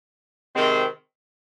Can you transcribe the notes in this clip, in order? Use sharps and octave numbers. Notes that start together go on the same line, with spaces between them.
C3 D#3 G#3 C4